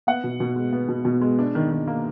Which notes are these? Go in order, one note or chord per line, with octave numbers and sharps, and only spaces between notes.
B3 F#5
B2
B2
G#3
B3
B2
B2
G#3
D4
D#3
D#3
A#3